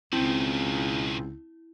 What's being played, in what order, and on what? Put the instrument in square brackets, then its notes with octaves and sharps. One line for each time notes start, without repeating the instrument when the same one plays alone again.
[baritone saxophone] C#2 [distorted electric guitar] B2 D#3 [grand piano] C4 [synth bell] E4